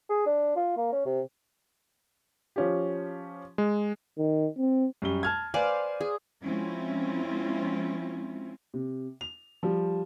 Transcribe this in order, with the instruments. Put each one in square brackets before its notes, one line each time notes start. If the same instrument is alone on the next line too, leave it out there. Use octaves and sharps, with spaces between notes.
[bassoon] G#4
D4
F4
A#3
C#4
C3
[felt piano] F3 C#4 G4
[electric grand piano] G#3
[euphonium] D#3
C4
[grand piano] F#2 G3 G7
A5 F6 G#6
[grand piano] B4 G#5 [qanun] C5 D5 F5
[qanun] G#4
[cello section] F3 G#3 C4 C#4 E4 F4
[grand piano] C3
F7
F3 G3